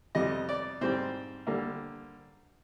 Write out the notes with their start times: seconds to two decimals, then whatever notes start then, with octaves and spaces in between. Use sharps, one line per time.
0.15 F2 C3 G3 D#5
0.49 D5
0.81 G#2 G3 C4 C5
1.47 D3 G3 A#3